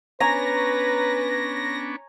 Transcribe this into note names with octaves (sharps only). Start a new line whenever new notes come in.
B3 C#4 D4 B4 C#5 G#5 A#5 A#6